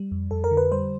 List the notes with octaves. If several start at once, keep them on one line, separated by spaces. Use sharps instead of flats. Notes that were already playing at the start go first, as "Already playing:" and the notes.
Already playing: G3
F2
F2 A4
A#4
D3
B4
G3 C5